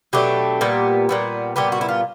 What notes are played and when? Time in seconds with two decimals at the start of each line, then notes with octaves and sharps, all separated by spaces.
0.13 B2 F#3 A3 D4 G4
0.61 A#2 G3 B3
1.09 A#2 G3 B3
1.56 A#2 G3 B3 G4
1.72 F#4
1.81 E4
1.89 F4